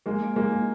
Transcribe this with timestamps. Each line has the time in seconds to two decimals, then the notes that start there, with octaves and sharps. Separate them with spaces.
0.06 G#3 A#3
0.36 G#3 A#3